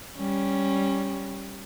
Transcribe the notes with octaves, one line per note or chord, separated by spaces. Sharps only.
G3 C#4